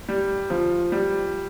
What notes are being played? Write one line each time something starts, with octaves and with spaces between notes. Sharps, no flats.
G3
F3
G3